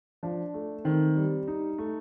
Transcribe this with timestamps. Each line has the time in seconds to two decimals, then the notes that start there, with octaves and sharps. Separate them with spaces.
0.23 F3 D4
0.54 A3
0.84 D#3 C4
1.16 G3
1.48 D#4
1.78 A3